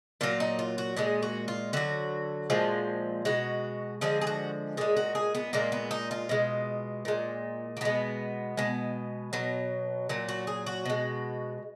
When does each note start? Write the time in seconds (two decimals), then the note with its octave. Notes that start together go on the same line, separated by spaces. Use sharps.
0.21 A#2 F#3 F4
0.40 D#4
0.59 F4
0.78 F#4
0.96 A#2 G#3 G#4
1.23 F#4
1.48 F4
1.73 D3 F#3 F#4
2.50 A#2 F3 G#3
3.25 B2 G#3 F#4
4.01 D3 F3 G#3 G#4
4.21 G#4
4.27 F#4
4.77 A#2 G#3 G#4
4.97 F#4
5.15 G#4
5.35 B3
5.53 A#2 G#3 A#3
5.72 B3
5.91 D#4
6.11 F4
6.29 B2 G#3
7.05 A#2 G#3
7.77 A#3
7.81 B2 G#3 B3
8.57 B2 G#3
9.33 B2 F#3
10.09 A#2 F#3
10.29 F#4
10.47 G#4
10.66 F#4
10.85 B2 G#3